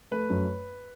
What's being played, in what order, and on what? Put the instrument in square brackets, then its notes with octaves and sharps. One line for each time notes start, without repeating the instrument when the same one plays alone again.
[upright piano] A3 [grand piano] B4
[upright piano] F#2